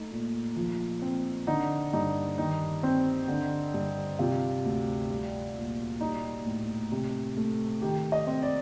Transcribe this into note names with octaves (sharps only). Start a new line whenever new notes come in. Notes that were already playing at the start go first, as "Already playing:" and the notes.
Already playing: A3 D#4
A#2
F3
C4
D3 D#4
G2 D#4
D#3 D#4
C4
D3
G2
C3 F4
D2
G3
A#2
G3 D#4
A2
C3
A3
D#3 G4
D#5
C4
D5